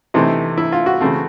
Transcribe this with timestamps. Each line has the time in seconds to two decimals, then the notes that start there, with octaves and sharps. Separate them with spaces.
0.14 C3 E3 A3 C4 D#4
0.58 E4
0.72 F4
0.86 F#4
1.01 C#3 E3 A3 C4